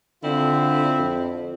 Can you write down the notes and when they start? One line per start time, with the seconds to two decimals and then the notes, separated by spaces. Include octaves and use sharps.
0.23 D3 C4 E4 F4
0.99 F2